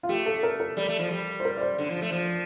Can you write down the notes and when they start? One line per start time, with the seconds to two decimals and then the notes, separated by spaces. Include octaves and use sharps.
0.03 F4
0.09 A3 G4
0.26 A4
0.43 A#4
0.60 A#4
0.77 G3 D5
0.88 A3
0.99 F3
1.11 G3
1.40 C5
1.45 A#4
1.57 D5
1.61 C5
1.78 D3
1.90 F3
2.02 A3
2.12 F3